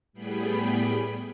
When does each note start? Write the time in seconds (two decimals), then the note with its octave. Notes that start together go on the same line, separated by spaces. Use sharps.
0.13 A2 G3 B3 G#4 G5 B5